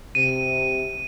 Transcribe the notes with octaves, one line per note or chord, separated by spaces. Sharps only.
C3 D#7